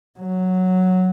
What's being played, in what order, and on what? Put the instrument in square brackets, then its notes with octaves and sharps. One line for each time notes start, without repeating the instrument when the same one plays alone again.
[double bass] F#3